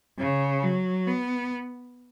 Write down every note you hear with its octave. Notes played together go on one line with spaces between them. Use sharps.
C#3
F#3
B3